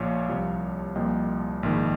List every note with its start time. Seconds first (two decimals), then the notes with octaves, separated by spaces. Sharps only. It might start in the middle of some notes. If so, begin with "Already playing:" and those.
Already playing: A#1 A#2 F3 C#5 F5
0.28 C2 C3 F3
0.95 C2 A#2 F3 D#5 G5
1.63 A#1 G#2 D#3